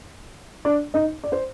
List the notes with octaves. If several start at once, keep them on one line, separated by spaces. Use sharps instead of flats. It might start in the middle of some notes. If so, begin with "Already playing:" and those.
D4 D5
D#4 D#5
D5
C5